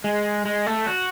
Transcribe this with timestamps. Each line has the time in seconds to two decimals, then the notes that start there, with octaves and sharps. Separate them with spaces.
0.04 G#3
0.45 G#3
0.66 A3
0.87 F#4